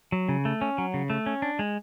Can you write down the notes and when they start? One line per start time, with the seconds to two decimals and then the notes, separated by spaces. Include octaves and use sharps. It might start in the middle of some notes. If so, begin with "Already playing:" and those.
0.12 F#3
0.29 C#3
0.45 A3
0.61 C#4
0.78 F#3
0.94 C#3
1.10 A3
1.26 C#4
1.42 D4
1.59 G#3